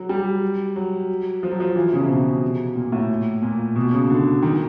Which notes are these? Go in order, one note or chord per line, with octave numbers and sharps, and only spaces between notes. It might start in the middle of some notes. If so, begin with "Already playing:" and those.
Already playing: F#3
G3
F#3
F3
F#3
F3
E3
C#3
C3
B2
A#2
A2
A#2
B2
C#3
D3
D#3